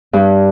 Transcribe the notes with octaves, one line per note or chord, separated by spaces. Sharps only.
G2